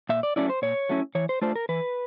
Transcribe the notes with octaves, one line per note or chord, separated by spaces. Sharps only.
A#2 E5
D5
F#3 A3 C#4 E4 D5
C5
A#2 C#5
F#3 A3 C#4 E4
E3 C#5
C5
A3 D4 F4 C5
A#4
E3 B4